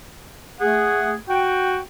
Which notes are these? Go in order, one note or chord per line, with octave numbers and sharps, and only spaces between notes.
A3 G#4 F#5
F#4 G5